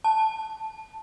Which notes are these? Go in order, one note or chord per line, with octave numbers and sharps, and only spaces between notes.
A5